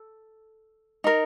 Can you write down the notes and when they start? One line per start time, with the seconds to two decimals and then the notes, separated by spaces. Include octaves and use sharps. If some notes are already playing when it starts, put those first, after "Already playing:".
Already playing: A4
1.04 D#4 A#4